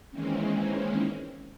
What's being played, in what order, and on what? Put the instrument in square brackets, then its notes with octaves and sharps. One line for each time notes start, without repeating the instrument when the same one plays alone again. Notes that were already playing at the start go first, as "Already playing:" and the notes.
[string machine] D#3 E3 G#3 A#3 C4 C#4